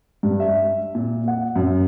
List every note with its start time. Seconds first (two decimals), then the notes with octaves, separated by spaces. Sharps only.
0.23 G2
0.40 E5
0.95 A#2
1.28 F#5
1.56 F#2